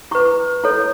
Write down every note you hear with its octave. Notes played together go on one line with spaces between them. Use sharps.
E4 B4 C#6
E4 A4 C#5